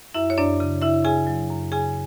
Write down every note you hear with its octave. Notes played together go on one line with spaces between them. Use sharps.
F#2 E4 E5
C#5
F#2 D4 D5
C#3
C#3 E4 E5
C#3 G#4 G#5
F#3
F#2
C#3 G#4 G#5